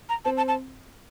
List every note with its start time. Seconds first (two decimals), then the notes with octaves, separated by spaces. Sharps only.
0.09 A#5
0.25 C4 A5
0.37 A5
0.48 A5